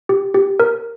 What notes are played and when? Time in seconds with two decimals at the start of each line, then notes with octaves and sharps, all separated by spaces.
0.09 G4
0.34 G4
0.60 A#4